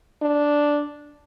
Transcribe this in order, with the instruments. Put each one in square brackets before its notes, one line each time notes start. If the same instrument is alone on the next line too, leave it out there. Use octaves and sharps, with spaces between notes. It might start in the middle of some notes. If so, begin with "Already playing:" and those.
[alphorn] D4